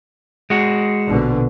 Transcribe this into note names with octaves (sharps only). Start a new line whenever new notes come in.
G#3 F#4
A#1 B2 D3